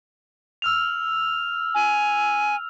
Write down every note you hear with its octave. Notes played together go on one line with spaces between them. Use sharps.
E6 F6 F7
G#5